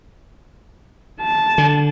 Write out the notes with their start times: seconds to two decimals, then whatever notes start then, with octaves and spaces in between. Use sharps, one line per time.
1.21 A5
1.58 D3